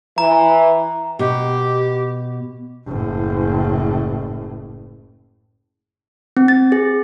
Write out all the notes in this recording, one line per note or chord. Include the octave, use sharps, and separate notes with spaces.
E3 A#5
B2 G4
F#1 A2
C4
A6
G#4